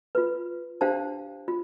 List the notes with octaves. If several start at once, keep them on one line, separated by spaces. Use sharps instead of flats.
F4 B4
D4 G4 C5 F5 A5
F4